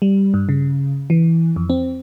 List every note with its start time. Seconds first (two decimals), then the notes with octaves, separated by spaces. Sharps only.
0.02 G3
0.34 G2
0.49 C#3
1.10 E3
1.56 F2
1.70 C4